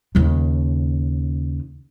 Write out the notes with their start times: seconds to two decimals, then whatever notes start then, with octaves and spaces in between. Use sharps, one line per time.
0.15 D#2 C#3